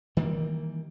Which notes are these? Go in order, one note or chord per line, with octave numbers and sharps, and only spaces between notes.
D#3 E3 G3 A#3